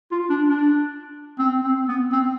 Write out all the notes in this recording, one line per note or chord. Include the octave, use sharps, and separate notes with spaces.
F4
D4
D4
C4
C4
B3
C4